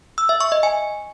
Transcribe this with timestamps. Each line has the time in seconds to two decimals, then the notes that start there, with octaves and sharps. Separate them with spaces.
0.18 E6
0.29 E5
0.41 C#6
0.52 D#5
0.63 G#5